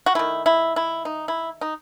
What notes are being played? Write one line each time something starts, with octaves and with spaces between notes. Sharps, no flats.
F#4
D#3 A3 E4
E4
E4
D#4
E4
D#4